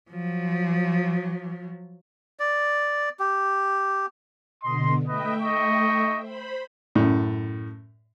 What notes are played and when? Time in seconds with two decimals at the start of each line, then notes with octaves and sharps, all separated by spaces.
0.11 F3 F#3
2.39 D5
3.19 G4
4.63 B2 D3 D#5 C6
5.08 A3 B4 D#5 E5 G5
5.42 D#4 D#5 C#6
6.20 C5 B5
6.95 F#2 A2